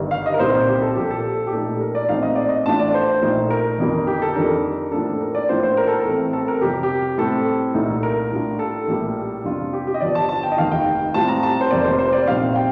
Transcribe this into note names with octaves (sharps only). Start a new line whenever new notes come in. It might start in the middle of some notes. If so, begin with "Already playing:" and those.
Already playing: G1 G2 D#3 G3
F5
D#5
A#4
C2 A#2 G3 C4 D#4 C5
G4
A4
A#1 A#2 F3 G4
A4
G4
A#2 A3 D#4 A4
A#4
D5
A#1 A2 A3 C4 D#4 F5
D#5
D5
D#5
A1 A2 A3 D4 F4 A5
D5
C5
A#1 A#2 A3 D#4
A#4
G1 F2 D#3 G3 A#3
G4
A4
F2 D#3 G3 D4 A#4
A2 F3 A#3 D4 A4
A#4
D5
A2 F3 A#3 D4 F4 C5
C5
A#4
A4
A#4
A1 A2 A3 C4
A4
A#4
F2 C3 G3 G4
G4
A2 G3 C4 A4
C2 A#2 A3 D#4
A#4
A2 G3 D4 F4
A4
A#1 A2 G3 A#3
F2 C3 G3 D4 F4
G4
G4
D#5
G1 G2 F3 D5
A5
A5
G5
D#5
F1 D#2 D#3 F5
G5
A2 G3 C4 F4 A5
A#5
A5
C5
F1 F2 C3 G3 A#3 D5
C5
C5
D5
A#1 A#2 G3 C4 D#4 F5
G5